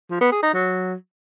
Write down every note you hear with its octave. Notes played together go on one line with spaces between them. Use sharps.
F3
B3
G#4
D#4
F#3